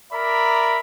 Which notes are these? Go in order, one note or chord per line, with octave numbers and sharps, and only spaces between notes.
A#4 D5 E5 A#5 B5